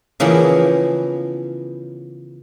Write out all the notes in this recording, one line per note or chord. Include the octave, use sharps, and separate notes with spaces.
C#3 E3 F3 A#3 B3